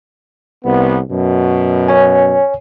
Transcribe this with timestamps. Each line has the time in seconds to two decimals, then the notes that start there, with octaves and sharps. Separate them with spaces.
0.65 C2 B3
1.11 F#2 B2
1.88 C#5 G#5